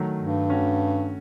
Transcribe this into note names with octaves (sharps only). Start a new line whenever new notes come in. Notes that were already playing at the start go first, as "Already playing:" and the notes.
Already playing: D#3 F#3 A3
G2
A3 C#4 F#4